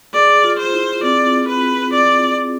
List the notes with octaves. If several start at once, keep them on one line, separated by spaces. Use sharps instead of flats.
G#4 D5
F4
C5
E4
C4 D5
B4
D5